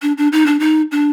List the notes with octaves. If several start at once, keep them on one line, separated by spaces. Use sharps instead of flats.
D4
D4
D#4
D4
D#4
D4